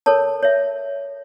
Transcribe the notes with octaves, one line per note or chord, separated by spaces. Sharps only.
A4 A#4 C#5 A5
C#5 E5